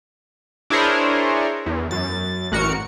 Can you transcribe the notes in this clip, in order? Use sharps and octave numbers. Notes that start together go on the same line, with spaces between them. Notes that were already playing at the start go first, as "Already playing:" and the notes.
D4 E4 G#4 A#4 C5 C#5
E2
F#2 A6
A1 F#4 A#4 C#7